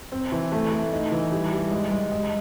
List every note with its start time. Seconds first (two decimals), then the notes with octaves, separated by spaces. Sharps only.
0.12 C4
0.32 E3
0.52 A3
0.72 A3
0.92 D#4
1.12 E3
1.32 G3
1.52 G3
1.71 G#3
1.91 G#3
2.12 G#3